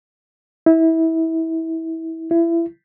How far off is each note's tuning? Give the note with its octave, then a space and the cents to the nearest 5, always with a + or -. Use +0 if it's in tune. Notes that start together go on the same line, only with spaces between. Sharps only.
E4 -25
E4 +25